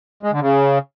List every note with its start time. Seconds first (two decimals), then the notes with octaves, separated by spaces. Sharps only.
0.23 G#3
0.32 D3
0.41 C#3